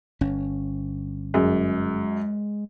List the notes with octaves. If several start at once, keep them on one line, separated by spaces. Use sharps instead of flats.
G1 C#4
F#2 G#3